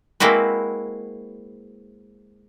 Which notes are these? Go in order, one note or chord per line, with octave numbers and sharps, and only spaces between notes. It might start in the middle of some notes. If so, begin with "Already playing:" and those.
G#3 A#3 C4 E4 F#4 B4